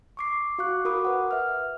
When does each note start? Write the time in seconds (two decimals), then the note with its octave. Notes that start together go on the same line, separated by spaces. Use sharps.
0.17 C#6 D6 C7
0.58 F#4 F5 C#6 D6 F#6
0.85 F#4 A#4 B5 D6 D#6
1.05 B4 F#5
1.31 E5 F6